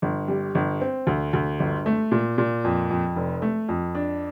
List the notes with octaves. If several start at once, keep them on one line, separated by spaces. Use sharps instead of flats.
G1
G3
G1
C4
D2
D2
G1
A3
A#2
A#2
F2
F2
F1
A3
F2
D4